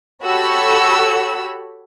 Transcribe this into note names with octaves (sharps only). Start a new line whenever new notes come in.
F#4 G4 A4 C#5 B5 E6